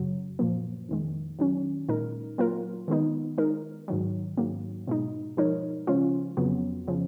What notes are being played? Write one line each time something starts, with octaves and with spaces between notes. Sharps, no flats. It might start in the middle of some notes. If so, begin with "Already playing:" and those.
Already playing: F#2 C#3 F#3
A#2 F3 A#3
F2 D#3 G#3
D#3 F#3 C#4
A#2 G#3 D#4 A#4
F#3 A#3 F4 A#4
D#3 G#3 B3 D#4
G#3 D#4 A#4
G#2 D#3 F#3
G#2 F#3 A#3
B2 G#3 D#4
F3 G#3 D#4 A#4 C#5
C#3 F3 G#3 C#4 F4
F2 C#3 F#3 B3
C#3 F3